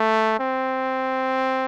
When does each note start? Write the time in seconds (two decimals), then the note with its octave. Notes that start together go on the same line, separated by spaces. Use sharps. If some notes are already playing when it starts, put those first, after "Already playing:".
Already playing: A3
0.40 C4